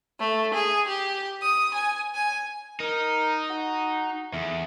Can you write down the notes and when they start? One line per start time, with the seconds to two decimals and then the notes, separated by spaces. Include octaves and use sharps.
0.20 A3
0.54 G#4
0.88 G4
1.42 D#6
1.74 G#5
2.15 G#5
2.80 D#4 A#4
3.50 F#4
4.33 E2 A3